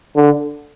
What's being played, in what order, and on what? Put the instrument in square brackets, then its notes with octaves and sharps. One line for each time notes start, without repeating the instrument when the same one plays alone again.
[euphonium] D3